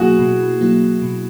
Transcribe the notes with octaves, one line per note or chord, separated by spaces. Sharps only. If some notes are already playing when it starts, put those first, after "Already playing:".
Already playing: B2 F#3 A#3 E4 F#4 G#4
B2
F#3 A#3 E4
B2